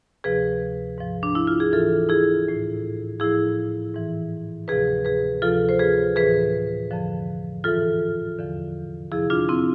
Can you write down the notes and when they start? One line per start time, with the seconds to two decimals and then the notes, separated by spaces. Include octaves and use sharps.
0.24 D2 C3 F3 G#4 B4
0.98 G#2 F3
1.23 D4
1.35 E4
1.47 F4
1.60 G#4
1.72 G#2 E3 F4 A4
2.09 E4 G#4
2.47 A2 E3
3.20 A2 F3 E4 G#4
3.95 G#2 E3
4.68 D2 C3 F3 G#4 B4
5.05 G#4 B4
5.42 D2 C3 F3 F4 A4
5.69 C5
5.79 G#4 B4
6.16 A2 E3 G#4 B4
6.91 F2 D3 F3
7.64 G#2 E3 F4 A4
8.39 E2 D3 F3
9.12 F2 C3 F3 E4 G#4
9.30 D4 F4
9.49 C4 E4